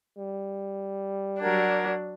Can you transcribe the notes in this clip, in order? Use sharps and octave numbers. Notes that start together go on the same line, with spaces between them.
G3
F#3 D4 A#4 F#5 G#6